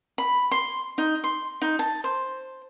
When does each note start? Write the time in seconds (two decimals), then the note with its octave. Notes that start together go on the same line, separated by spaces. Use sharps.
0.18 B5
0.52 C6
0.98 D#4
1.24 C6
1.62 D#4
1.79 A5
2.04 C5